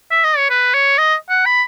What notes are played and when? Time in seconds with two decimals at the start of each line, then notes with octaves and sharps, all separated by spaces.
0.11 E5
0.24 D#5
0.37 C#5
0.50 B4
0.74 C#5
0.98 D#5
1.29 F#5
1.46 B5